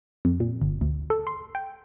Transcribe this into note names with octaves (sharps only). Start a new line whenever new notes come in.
F2
A#2
G1
D2
A4
C6
G5